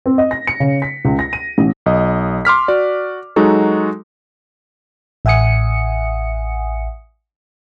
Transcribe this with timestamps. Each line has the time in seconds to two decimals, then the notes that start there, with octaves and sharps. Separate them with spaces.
0.06 C4
0.18 D#5
0.31 A#6
0.47 C#7
0.60 C#3
0.82 B6
1.05 C#2
1.19 A#6
1.33 D#7
1.58 A1
1.86 B1 D#5
2.45 C6 D6 F6 B6
2.68 F#4 D5
3.36 F#3 G#3 D#4 F#4 A4
5.25 A1 E5 F#5 G#5 D#6 C#7